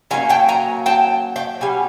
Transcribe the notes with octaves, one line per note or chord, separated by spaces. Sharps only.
D#3 F#3 A#3 C#4 G#5 A#5
G5 A5
G#5 A#5
G5 A5
G5 A5
B2 G3 G#5